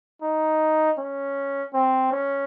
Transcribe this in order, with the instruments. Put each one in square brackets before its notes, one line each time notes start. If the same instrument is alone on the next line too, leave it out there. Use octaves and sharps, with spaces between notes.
[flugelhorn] D#4
C#4
C4
C#4